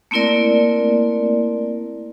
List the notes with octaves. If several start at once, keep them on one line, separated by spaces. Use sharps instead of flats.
A3 A#3 C4 E4 A#4 D5